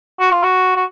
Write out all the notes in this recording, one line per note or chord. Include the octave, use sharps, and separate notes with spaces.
F#4
F4
F#4
F#4